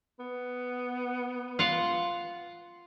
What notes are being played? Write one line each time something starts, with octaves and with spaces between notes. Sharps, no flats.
B3
F4 F5 F#5